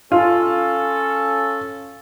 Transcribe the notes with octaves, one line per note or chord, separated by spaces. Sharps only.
C#4 F4 A4